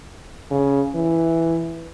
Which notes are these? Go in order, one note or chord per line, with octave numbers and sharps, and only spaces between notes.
C#3
E3